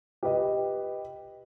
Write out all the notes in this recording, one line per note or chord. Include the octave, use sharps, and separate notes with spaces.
G4 B4 D#5